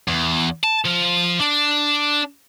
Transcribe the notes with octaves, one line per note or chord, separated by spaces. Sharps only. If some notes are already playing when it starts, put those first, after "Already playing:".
E2
A5
F3
D4